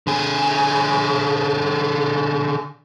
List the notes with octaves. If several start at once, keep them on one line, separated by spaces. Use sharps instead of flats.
D3 G#4